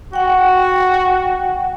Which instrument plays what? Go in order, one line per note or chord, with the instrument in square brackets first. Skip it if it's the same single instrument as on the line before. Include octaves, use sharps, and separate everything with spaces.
[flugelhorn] F#4 [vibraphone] F#5 G5